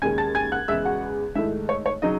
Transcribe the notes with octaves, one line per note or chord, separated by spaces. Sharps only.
D#2 C#3 G#3 C#4 G#5 G#6
A5 A6
G#5 G#6
F#5 F#6
E2 C#3 G#3 E5 E6
F#4 F#5
G#2 D#3 A3 E4 E5
C#5
C#5
C#3 F#3 D#4 D#5